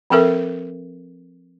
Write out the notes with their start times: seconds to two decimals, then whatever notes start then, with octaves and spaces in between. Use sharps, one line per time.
0.10 F3 C4 A4 A#4 E5